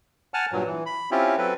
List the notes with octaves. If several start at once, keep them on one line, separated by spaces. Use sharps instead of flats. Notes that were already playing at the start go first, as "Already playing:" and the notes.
F#5 G#5 A5 F6
G2 A#2 F#3
E3
B5
C4 C#4 E4 F4 G4
F#3 C4 A4 B4